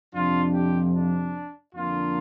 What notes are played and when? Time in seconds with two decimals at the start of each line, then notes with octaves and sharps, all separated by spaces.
0.15 F2 C3 F3 D4 F4
0.54 G4
0.94 D4
1.75 F2 D3 A#3 D4 F4